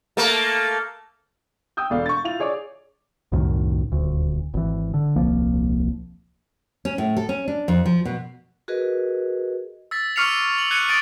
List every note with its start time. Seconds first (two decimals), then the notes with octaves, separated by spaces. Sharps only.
0.17 A3 A#3
1.77 G5 D#6 E6 G6
1.90 E1 B2 D4 A4 F5
2.06 C#6 A6
2.23 E4 F4 F7
2.40 G#4 C#5 D5 D6
3.32 C2 F#2 A2 D#3
3.92 D#1 D2
4.54 G#1 E3
4.94 D3
5.16 D#1 C2 F3 A#3
6.85 C#4
6.98 A2
7.17 A4
7.29 C#4
7.48 D4
7.68 F2
7.85 F3
8.05 B2
8.68 F#4 G#4 A#4 B4 D#5
9.91 E6 A6 B6
10.16 C#6 D6 F6 C7 C#7 F7
10.58 F#7
10.71 F#6 G#6 C#7 D#7
10.88 D6 D#6 A6 D7 D#7